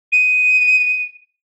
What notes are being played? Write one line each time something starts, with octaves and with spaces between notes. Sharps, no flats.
D#7